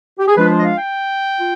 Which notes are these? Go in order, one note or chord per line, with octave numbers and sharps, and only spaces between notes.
G4
G#4
F3 G#3 D4 F4 B4
C5
D#5
F5
G5
F4